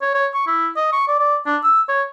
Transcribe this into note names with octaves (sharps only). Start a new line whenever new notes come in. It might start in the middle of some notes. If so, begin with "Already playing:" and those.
C#5
C#5
C#6
E4
D#5
C#6
D5
D5
D4
E6
C#5